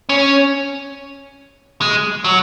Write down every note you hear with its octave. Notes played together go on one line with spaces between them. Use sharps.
C#4
G#3
F#3